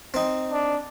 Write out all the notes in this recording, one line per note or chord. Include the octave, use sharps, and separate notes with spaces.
C4 D#4
D4